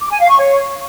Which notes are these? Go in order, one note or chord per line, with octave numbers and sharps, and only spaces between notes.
D6
G#5
F5
C#6
C#5